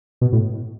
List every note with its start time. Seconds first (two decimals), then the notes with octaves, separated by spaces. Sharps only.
0.21 B2
0.32 A2